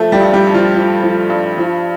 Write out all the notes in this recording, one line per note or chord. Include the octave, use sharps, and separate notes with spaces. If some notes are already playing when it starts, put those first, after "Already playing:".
Already playing: F3 A3 A4
G3 G4
G2
G3 G4
G2
F3 F4
F3
F3
G2
F3